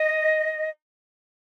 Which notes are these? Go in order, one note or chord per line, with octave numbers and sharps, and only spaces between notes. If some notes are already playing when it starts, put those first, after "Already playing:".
Already playing: D#5